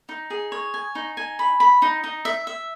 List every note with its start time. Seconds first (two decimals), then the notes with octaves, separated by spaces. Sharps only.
0.09 D#4
0.30 G#4
0.52 C#5
0.74 G#5
0.95 D#4
1.17 G#5
1.39 B5
1.60 B5
1.82 D#4
2.04 D#4
2.25 E5
2.47 E5